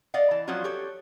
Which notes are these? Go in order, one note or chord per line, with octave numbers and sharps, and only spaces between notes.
D5 D#5 F5 F#5
E3 A5
F3 F#3 C#4 F4 F#4
G4 A4 C#5